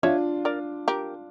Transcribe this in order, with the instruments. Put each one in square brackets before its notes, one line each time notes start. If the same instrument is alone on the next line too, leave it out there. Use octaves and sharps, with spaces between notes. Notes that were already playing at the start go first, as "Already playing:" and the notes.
[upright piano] D4 F4 [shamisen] C#5 E5
[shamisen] A#4 D5
G4 A#4